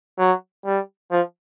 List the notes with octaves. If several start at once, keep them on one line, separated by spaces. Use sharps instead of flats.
F#3
G3
F3